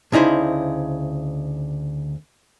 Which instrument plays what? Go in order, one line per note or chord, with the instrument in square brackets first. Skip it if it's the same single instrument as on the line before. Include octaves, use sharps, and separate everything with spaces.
[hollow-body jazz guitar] D2 C#3 D#4 E4 C5